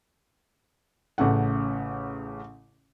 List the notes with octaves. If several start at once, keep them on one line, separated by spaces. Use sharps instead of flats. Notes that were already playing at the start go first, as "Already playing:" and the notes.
A1 C#3 A3 F#5